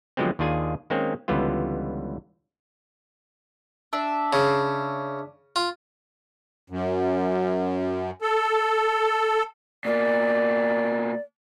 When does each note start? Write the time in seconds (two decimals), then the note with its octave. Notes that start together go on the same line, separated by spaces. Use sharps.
0.17 D3 F3 F#3 G#3 B3 C4
0.39 D#2 D#3 D4 F4 G#4 G#5
0.90 D#3 G#3 A#3 C4 C#4
1.28 C#2 D3 E3 G3 B3 F4
3.93 D4 E5
4.33 C#3
5.56 F4
6.70 F#2
8.22 A4
9.85 B2 A#3 D5